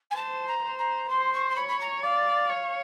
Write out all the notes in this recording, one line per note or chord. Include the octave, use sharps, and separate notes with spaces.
G#5
C5 A5
A#5
C5
A#5
C5 C6
C#6
C6
C#5 B5
B5
A#5
D5 F5
C#5